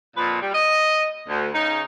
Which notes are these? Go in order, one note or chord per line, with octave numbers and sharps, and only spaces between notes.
F2 A#2 F3 B4
G3
D#5
D2
C#3 D#4